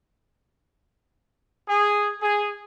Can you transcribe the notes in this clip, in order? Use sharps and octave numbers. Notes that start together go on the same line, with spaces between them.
G#4
G#4